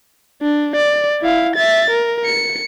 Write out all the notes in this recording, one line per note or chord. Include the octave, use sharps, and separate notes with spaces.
D4
D5
E4 F5
E5 A6
A#4
C#7